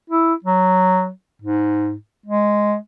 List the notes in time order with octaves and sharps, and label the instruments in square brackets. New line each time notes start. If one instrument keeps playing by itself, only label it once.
[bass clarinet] E4
F#3
G#2
G#3